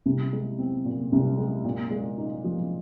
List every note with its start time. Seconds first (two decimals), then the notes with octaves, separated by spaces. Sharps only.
0.06 C2
0.33 G#3
0.58 C4
0.85 A#2
1.12 C2
1.38 G#3
1.64 A#2
1.90 G#3
2.18 D#4
2.44 F3